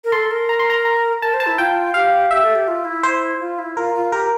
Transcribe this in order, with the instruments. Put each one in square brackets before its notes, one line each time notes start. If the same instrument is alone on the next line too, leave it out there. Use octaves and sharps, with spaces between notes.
[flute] A#4
[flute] A4 [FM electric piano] C6
[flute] A#4
[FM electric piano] A#5
C6
A#5
A#5
[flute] A#4 [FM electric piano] A5
[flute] C5
[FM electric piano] A5
[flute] E4
[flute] F4 [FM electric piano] G5
[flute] G4 [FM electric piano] F5
[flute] G4 [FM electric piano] E5
[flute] A4
G4
F4
E4
[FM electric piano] C5
[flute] F4
E4
[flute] F4 [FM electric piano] A#4
[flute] F4
[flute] G4 [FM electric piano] A#4